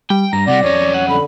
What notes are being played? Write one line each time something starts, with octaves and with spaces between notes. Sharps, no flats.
G3 G5
G2 A#5 A#6
C3 G3 D5 F#5
F2 C#4 C#5
F#5
D3 B5